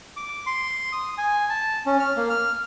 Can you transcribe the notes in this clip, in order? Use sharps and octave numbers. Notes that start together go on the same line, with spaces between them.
D6
C6
D#6
G#5
A5
C#4
F6
A#3
F6